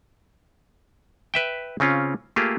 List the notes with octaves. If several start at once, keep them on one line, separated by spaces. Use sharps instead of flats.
B4 E5 G5
C#3 C4 C#4 F4
A3 A#3 F4 G4 G#4